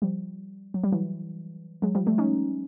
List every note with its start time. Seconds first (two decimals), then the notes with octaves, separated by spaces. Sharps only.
0.02 F3 G3
0.74 F#3
0.84 G3
0.92 E3 F#3
1.82 F#3 G#3
1.95 F3 G3
2.07 G3 A3
2.18 C#4 D#4